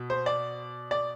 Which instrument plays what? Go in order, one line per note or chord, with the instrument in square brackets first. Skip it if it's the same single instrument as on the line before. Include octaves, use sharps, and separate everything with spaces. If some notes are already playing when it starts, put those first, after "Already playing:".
Already playing: [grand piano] B2
C5
D5
D5